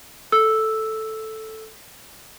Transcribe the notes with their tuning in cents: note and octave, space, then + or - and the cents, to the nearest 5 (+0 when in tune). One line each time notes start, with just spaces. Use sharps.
A4 +0 E6 +0